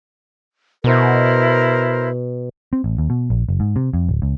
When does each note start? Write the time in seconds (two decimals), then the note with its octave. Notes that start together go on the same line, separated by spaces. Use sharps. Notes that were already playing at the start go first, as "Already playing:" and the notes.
0.84 B2 E4 A#4 C5
2.73 C4
2.84 A1
2.98 D#2
3.10 B2
3.30 A#1
3.49 F#1
3.60 G#2
3.76 C3
3.93 F2
4.09 D1
4.22 C#2